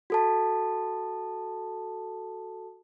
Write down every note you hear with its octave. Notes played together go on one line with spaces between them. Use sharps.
F#4 A4 A5